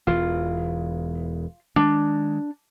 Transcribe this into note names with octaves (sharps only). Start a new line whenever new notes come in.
E1 E2 E3 F4
D#3 G#3 D4